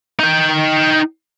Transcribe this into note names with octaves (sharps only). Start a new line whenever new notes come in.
D#4 G5